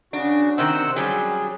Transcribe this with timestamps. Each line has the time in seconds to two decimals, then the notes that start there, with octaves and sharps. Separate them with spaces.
0.13 C#3 D4 F#4
0.58 C3 D#3 C5 F#5 E6
0.96 F#3 G3 C#4 G#4